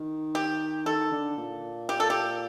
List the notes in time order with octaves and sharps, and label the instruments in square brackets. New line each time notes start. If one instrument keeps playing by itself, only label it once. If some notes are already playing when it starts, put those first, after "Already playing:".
Already playing: [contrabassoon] D#3
[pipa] G4
[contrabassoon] D#3 [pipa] A4
[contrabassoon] D3
A#2
[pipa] G4
A4
G4